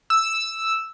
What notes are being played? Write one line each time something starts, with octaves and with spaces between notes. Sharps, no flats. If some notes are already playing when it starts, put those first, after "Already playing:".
E6